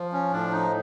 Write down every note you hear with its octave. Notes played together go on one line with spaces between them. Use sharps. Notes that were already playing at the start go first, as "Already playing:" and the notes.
Already playing: F3
C#4
A2 D4
D#4